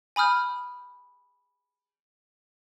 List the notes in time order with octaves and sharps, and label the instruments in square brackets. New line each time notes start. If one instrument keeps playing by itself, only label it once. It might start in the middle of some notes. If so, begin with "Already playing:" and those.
[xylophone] G#5 B5 D#6 F6 G6